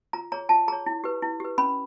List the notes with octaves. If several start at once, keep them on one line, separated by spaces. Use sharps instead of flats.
F4 A#5
G#4 C#5 A#5
F4 A5
G#4 C#5 A#5
E4
G4 B4
E4
G4 B4
C#4 B5